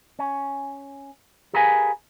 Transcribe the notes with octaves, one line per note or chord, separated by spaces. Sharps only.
C#4
G4 G#4 A#4 B4 F5 G#5